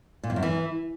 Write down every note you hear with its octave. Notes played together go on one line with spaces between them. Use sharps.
A#2
F2
F#2
E3